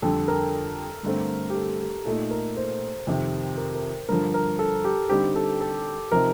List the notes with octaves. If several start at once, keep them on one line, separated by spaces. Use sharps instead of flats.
F2 D3 G3 A4
A#4
G2 D3 A3 C4
G4
A4
G4
A#2 A3 D#4 A4
A#4
C5
F2 C3 D#3
A#4
A#4
G2 D3 F3 A#4
A#4
A4
G4
D3 G3 C4 D#4 G4
A4
A4
C3 F3 C4 D#4 A#4